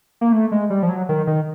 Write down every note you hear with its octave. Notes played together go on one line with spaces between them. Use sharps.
A#3
A3
G#3
G3
F3
F#3
D#3
D#3